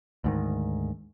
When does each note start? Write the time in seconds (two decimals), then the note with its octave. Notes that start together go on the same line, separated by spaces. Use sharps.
0.24 D2 G#2 D#3